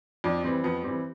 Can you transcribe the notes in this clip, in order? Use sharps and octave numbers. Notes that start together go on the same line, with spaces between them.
F2 D4
E3 G3 C4
F2 B3
E3 G3 C4